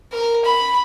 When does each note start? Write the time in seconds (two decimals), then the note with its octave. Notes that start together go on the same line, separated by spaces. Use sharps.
0.12 A#4
0.45 B5